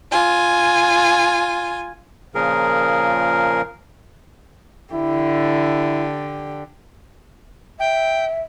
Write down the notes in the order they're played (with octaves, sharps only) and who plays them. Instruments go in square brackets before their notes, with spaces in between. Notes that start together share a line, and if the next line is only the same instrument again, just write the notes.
[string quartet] F4 G#5
[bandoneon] A#2 C#3 F3 G#4 A#4
[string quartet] D3 G4 [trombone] E4
[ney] E5 [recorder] G5